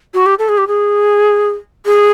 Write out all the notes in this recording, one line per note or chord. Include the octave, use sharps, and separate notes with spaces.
F#4
G4
A4
G#4
G4
G#4
G#4